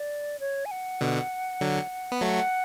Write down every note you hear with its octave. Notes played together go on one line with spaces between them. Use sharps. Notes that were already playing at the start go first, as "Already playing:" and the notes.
Already playing: D5
C#5
G#5
F#5
B2 D3
D3 F#3
B3
F#3 A3 F#5